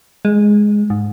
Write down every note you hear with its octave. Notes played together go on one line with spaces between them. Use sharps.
G#3
G#2